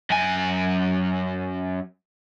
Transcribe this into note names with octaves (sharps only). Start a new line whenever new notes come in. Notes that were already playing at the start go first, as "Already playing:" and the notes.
F#2 G#5